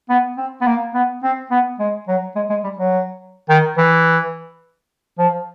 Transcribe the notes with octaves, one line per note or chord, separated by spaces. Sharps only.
B3
C4
B3
A#3
B3
C4
B3
G#3
F#3
G#3
G#3
G3
F#3
D#3
E3
F3